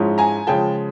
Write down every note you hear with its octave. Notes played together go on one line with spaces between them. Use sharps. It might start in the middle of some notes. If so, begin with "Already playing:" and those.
Already playing: G#2 F3 G#3 C#4 E4
G#5 A#5
C#3 F3 G#3 G5 A5